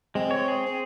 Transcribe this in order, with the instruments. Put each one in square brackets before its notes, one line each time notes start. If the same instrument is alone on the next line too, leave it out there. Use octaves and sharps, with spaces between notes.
[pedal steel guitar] G#3 [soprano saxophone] C4
[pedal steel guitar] C#5
G#4
[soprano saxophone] C4